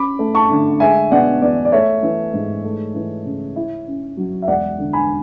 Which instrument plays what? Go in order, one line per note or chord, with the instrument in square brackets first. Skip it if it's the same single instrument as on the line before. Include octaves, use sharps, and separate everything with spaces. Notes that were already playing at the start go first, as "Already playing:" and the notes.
Already playing: [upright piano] C#4 B5 D6
A3
A5 C#6
D3
G#3 E5 G#5
B2 D5 F#5
E2 D5
D5
A3 C#5 E5
E3
G#2
A3
E3
C#3
E4
C#4
F#3
E5
E1 D5 F#5
D3
G#5 B5